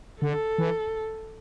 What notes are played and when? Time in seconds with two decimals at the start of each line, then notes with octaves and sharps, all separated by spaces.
0.21 D3 A4
0.58 E3